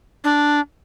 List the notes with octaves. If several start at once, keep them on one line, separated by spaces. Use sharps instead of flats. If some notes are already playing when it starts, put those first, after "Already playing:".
D4